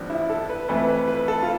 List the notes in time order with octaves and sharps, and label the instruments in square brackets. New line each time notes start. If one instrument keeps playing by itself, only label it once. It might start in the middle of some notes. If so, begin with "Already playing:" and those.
Already playing: [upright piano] A1 G2 F3 B3 D4
[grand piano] E4
A4
B4
[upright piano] F2 E3 A3 E4 [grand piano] B4
[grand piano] B4
B4
A4
F4